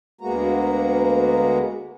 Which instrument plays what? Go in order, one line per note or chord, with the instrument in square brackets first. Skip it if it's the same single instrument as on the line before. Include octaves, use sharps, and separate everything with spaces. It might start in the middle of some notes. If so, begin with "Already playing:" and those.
[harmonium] D2 G#3 A#3 B3 F#4 A#5